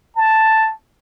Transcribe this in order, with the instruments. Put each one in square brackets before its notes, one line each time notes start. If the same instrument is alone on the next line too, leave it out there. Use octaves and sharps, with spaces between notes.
[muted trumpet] A5